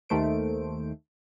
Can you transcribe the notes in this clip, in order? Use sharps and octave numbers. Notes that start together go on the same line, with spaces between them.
D#2 D#3 A3 C5 D7